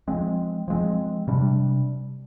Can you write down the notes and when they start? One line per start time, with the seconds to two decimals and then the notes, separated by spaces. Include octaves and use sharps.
0.08 F3 G#3 C4
0.68 F3 G#3 C4
1.28 C3 G3 D4